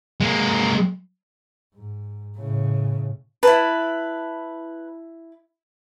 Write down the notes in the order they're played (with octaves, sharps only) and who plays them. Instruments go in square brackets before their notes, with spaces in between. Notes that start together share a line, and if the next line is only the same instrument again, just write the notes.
[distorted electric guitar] G#3 A#3
[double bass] G#2
A2 C#3
[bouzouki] E4 A5 [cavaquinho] B4